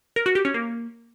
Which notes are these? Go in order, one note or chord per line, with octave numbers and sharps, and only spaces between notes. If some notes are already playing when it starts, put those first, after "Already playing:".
A#4
F#4
G4
C#4
A#3